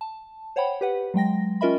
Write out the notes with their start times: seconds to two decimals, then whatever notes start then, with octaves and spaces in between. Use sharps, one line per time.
0.01 A5
0.56 C5 C#5 F#5 G5 B5
0.81 G4 B4 F#5
1.14 F#3 G#3 G5 A#6
1.61 C#4 F4 A#4 D#5 E5 B5